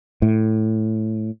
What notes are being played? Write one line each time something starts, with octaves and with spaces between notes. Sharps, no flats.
A2